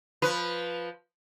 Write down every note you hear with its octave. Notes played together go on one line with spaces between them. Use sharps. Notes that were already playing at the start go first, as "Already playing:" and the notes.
F3 B4